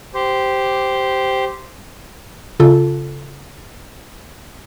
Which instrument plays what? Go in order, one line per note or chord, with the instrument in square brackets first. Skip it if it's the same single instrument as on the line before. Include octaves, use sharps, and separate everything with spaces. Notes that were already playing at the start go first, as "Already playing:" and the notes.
[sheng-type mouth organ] G4 C5
[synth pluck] C#3 F4 A4